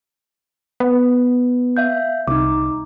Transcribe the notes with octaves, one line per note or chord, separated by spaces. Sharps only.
B3
E5 F5 G6
C2 D#4 D6